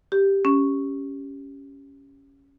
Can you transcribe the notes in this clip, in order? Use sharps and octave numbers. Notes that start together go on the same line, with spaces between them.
G4
C#4